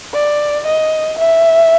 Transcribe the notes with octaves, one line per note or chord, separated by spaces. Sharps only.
D5
D#5
E5